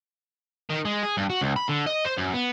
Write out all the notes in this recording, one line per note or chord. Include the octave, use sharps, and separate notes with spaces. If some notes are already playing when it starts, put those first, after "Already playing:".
D#3
G#3
G#4
G2
F#4
C#2
B5
D3
D#5
C5
F#2
B3